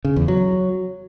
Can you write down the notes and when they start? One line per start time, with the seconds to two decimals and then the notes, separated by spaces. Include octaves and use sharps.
0.05 C#3
0.16 E2
0.28 F#3